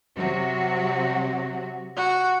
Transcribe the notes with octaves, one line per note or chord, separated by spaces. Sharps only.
C3 F#3 F#4
F#4